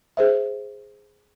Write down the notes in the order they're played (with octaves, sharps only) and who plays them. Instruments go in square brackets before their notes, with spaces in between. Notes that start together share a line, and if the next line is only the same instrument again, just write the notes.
[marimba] G#4 C5 E5